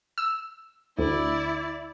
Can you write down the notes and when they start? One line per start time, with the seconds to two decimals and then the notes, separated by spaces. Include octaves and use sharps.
0.18 E6
0.98 D2 E4 D5